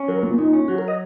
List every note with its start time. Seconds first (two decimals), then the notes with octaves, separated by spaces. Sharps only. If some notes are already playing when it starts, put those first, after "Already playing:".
Already playing: C#4
0.08 F#3 A#4
0.23 A#2 A#3
0.38 A#2 D#4
0.53 C#4
0.68 F#3 F#4
0.78 A#4
0.88 D#5